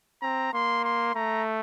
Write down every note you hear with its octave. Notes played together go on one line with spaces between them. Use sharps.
C4 A#5
A#3 C6
C6
A3 A#5